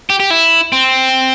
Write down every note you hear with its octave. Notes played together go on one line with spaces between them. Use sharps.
G4
G4
E4
C4